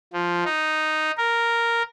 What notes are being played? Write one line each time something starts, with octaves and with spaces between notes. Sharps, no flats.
F3
D#4
A#4